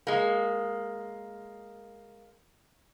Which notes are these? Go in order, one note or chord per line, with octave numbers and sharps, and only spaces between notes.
G#3 A#3